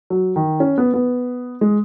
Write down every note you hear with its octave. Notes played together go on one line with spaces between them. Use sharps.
F#3
D#3
C#4
B3
B3
G#3